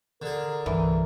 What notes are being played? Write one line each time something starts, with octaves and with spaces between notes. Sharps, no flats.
D3 G#4 A#4
C2 G2 E3